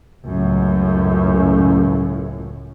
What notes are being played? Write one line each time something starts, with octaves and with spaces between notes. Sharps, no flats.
C#2 F#2 A2